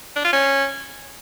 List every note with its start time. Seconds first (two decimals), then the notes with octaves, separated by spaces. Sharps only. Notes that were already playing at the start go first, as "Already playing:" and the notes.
0.16 D4
0.24 F4
0.33 C#4